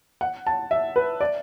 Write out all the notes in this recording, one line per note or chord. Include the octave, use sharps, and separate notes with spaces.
F#5
A5
E5
B4
D5